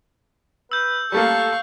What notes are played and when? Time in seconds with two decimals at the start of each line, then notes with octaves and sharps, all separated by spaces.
0.72 B4 E6 G6
1.12 G3 A3 A#3 A4 F5 C#6